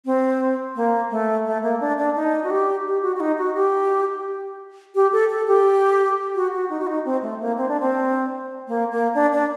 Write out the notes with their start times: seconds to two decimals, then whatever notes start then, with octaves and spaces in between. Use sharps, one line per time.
0.05 C4
0.76 A#3
1.11 A3
1.46 A3
1.63 A#3
1.80 D4
1.98 D4
2.15 D#4
2.44 F#4
2.50 G4
2.85 G4
3.02 F#4
3.16 F#4
3.20 D#4
3.38 F#4
3.55 G4
4.95 G4
5.12 A4
5.30 A4
5.48 G4
6.35 F#4
6.53 F#4
6.70 D#4
6.79 F#4
6.87 D#4
7.05 C4
7.22 A3
7.40 A#3
7.57 C4
7.68 D4
7.80 C4
8.68 A#3
8.91 A#3
9.14 D4
9.32 D4